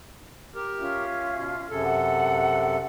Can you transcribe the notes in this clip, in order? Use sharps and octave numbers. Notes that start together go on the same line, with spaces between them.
G4 A#4
C#4 F4 E5
B2
F#2 C3 G#4 A4
F#5